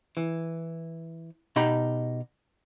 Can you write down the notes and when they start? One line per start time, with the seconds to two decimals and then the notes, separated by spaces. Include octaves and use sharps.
0.17 E3
1.56 B2 D#4 G4 A#5 B5